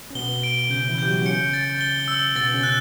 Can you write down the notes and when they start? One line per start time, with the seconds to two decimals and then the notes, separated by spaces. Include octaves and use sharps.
0.10 C#4
0.15 B2 B3 G7
0.43 D7
0.70 C#3 C#4 G6
0.88 E3 E4
0.98 G4 G6
1.07 F#3 F#4
1.21 B3
1.25 C#3 C#4 C#7
1.54 A6
1.81 G7
2.08 E6
2.35 B2 B3 A6
2.54 C#3 C#4
2.63 F#6